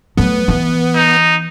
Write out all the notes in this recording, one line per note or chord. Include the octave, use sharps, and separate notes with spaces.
F#3 A3 B3
E3
D#4